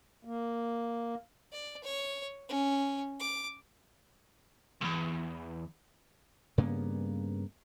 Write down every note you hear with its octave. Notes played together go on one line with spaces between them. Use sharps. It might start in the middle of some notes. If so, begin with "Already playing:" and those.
A#3
D5
C#5
C#4
D6
B1 E2
G2 C#3 A#3 B3